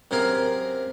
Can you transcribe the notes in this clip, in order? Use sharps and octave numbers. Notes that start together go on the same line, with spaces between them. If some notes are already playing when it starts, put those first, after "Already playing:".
F#2 C3 G#4 A#4 F5